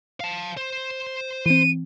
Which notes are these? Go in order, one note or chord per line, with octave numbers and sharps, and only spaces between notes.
F5 A5
C5
E3 C4 D#7